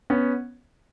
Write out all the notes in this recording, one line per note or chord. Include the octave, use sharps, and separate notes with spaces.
B3 C#4